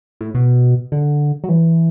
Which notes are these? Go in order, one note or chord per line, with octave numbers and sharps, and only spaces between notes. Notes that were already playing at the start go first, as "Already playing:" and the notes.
A2
B2
D3
F#3
E3